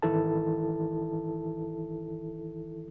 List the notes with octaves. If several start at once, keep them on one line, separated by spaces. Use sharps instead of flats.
G#1 D#3 E3 E4 A4 A5